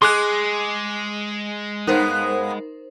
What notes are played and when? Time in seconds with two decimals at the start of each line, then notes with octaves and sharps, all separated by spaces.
0.02 G#3 G#4 C6 D6 F#6
1.87 G2 B3 D#4 A#4 C5